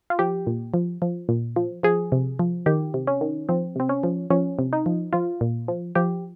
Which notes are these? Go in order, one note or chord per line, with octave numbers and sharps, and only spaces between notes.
F4
F3 G4
A#2
F3
F3
A#2
F3
F3 G#4
C3
F3
D#3 G4
C3
C#4
D#3
F3 C4
C3 C4
C#4
F3
F3 C#4
C3
D#4
F3
F3 F4
A#2
F3
F3 G4